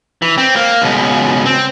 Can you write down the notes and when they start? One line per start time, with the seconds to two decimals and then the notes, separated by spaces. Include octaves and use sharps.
0.22 E3
0.38 C4
0.56 A#3
0.82 C#2 B2
1.46 C4